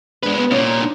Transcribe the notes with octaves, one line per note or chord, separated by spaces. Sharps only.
E2 G#2 G#3 D4 B4
D#2 G3 B3
C2 A#2 C#4 C#5
E5 A#5
D4 D#4